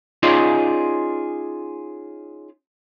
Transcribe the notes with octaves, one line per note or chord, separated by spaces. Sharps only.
C#4 D#4 F4 G#4 D5 D#5